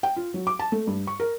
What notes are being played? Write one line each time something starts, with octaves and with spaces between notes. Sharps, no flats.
G5
F4
F#3
D6
A5
A3
G2
C#6
A#4